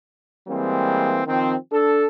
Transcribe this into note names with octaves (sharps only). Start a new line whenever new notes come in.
E3 G3 G#3 A#3 C4
D#3 F3 C4
D4 A4